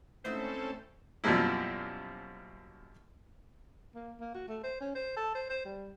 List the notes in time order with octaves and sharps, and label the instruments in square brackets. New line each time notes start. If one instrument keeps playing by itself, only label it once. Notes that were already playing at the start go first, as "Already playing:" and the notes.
[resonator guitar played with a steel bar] G#2 E4 E5 [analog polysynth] A3 [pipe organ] C4 C#4 A4 [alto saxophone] C5
[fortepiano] F#2 B2 F3 G3 A#3 E4
[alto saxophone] A#3
A#3
F#4
A3
C5
C#4
C5
A4
C5
C5
G3